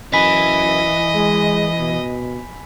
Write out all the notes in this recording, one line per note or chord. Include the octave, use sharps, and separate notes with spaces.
F#2 E3 D#5 G#5 B5 B6
G#3
B2